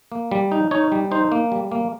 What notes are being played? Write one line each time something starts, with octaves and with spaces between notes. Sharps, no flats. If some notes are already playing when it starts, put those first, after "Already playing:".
A#3
G3
D#4
D#4 C#5
G3
D#4 C5
A#3
G3
A#3